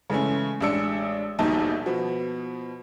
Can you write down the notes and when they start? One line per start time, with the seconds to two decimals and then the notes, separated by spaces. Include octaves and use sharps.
0.10 C#3 E3 G#3 A3 C#4
0.60 A1 G#3 D4 E6 C#7
1.39 D#1 A#1 B2 D#3 D#4 A5
1.86 B2 F3 B3